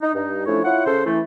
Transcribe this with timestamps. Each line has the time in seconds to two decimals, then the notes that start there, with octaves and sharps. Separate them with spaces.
0.01 D#4
0.14 G2 D#4
0.46 F3 A3 C#4 D4 E4 C#5
0.65 E4 F4 C#5 F#5
0.86 C#3 A4 C5
1.06 E3 A3